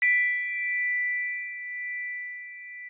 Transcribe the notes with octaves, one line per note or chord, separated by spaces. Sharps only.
B6 D7